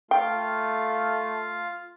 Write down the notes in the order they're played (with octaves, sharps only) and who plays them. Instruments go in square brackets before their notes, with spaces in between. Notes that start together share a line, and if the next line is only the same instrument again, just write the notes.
[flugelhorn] A3 [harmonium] F4 F5 [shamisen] G5